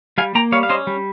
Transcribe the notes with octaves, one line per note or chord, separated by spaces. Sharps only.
G3 F5 G#5
A#3 G5 A#5
G3 C#5 F5
F5
C#4 C5 D#5
G3